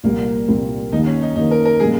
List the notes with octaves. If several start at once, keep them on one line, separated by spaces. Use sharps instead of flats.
C2 A#2 G3 A#3 C4
C2 A#2 G3 C4
D#2 D#3 A#3 D#4
C#4
D#4
D#2 D#3 A#3 D#4
A#4
A#4
A#2 G3 C#4 G#4